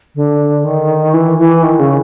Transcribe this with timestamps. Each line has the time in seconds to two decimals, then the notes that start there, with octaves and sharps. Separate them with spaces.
0.15 D3
0.64 D#3
1.14 E3
1.38 E3
1.63 D#3
1.79 C#3